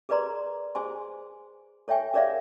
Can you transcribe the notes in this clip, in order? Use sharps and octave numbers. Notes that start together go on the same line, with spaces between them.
G#4 A#4 B4 D5 A#5 C6
G#4 C5 G#5 C6
A4 C#5 E5 G5 G#5
G#4 A#4 C#5 D5 E5 F5